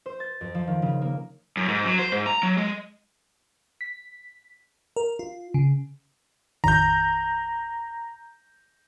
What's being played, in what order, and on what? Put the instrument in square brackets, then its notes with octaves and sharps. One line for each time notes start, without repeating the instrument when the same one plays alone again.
[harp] C5
A6
F2
F3
D#3
C#3
A#3
[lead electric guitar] F#2
G#2
F#3
C5
G#2
A#5
F#3
G#3
[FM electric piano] B6
A#4
F4
C#3
[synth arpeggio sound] A1 F2 D#3 [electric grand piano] A#5 G6